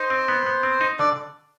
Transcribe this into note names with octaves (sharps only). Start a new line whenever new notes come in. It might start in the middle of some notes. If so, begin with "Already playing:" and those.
Already playing: D#4 C5
C4
B3
B3
C4
D#4
D3 D5